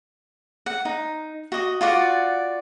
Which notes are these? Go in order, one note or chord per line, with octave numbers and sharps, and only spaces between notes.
F#5
D#4
F#4 D#5
F4 F#4 D5 F#5